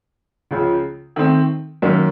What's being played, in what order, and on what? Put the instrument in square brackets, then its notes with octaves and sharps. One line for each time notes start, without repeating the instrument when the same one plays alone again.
[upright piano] C#2 C#3 F3
D#3 A3 C4
F#2 D#3 A#3 C#4